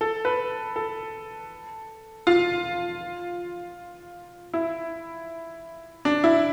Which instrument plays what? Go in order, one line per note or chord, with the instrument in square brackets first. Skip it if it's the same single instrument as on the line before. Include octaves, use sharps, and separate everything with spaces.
[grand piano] A4
B4
A4
F4
E4
D4
E4